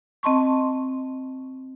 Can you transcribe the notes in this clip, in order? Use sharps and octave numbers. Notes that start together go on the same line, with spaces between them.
C4 D#5 A5 C6 C#6